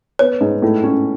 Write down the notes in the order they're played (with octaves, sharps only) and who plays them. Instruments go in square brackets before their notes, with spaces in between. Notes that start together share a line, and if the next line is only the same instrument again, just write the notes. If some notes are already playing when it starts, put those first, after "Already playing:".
[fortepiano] B3 [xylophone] C#5
[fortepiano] G#2
A2
C#4